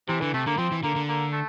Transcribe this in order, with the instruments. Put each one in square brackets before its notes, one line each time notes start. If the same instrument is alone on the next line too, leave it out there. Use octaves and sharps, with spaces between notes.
[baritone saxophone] C3 [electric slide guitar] E3
[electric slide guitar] D3 [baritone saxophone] E3
[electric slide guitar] C3 [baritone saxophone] A3
[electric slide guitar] D3 [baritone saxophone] A#3
[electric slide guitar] F3 [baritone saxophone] C4
[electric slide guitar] E3
[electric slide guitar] D3 [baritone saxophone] A#3
[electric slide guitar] D3
[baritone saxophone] A#3
A3